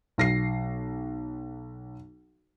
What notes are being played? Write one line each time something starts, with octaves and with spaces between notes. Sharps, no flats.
B1 A#6 C7